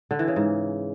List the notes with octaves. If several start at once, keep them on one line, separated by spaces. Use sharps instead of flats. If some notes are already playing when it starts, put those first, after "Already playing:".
D3
E3
C#3
G#2